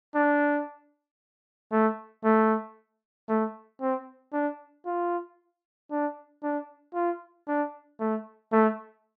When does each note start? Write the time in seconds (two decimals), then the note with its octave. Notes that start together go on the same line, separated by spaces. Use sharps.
0.15 D4
1.72 A3
2.24 A3
3.29 A3
3.81 C4
4.33 D4
4.86 F4
5.91 D4
6.43 D4
6.95 F4
7.48 D4
8.00 A3
8.52 A3